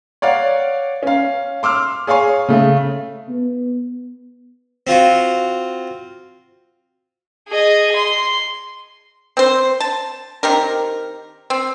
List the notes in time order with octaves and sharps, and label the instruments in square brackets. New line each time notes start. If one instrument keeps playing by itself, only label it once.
[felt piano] C#5 D5 F5 F#5
C#4 F5
C6 D6 E6 F6
G#4 C#5 F5 G#5 C#6
C#3 A3
[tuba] B3
[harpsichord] C4 F4 F#4
[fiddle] G#4 D#5
C6
[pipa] C4 C5
A5
D#3 C4 G4 A#4
C4